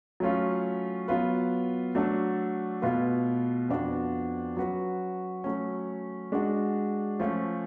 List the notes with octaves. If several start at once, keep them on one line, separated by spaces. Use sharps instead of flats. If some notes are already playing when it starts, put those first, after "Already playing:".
F#3 A3 C#4 F4
F#3 B3 F4 B4
F#3 A3 D4 F#4 A4
B2 A3 F4 B4
F2 F3 B3 D4 F#4
F#3 C#4 F#4 B4
F#3 A3 C#4
G#3 D4 F#4
F3 A3 C#4